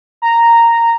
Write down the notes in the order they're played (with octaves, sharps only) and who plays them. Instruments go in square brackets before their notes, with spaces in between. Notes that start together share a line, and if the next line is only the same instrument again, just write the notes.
[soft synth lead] A#5